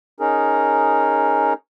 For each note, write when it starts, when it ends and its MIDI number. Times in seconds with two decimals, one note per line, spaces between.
0.20 1.53 61
0.20 1.53 63
0.20 1.53 68
0.20 1.53 70